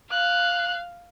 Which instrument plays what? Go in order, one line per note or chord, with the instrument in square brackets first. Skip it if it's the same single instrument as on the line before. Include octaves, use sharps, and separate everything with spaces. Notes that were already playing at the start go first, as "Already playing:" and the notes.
[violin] F5 [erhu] F#6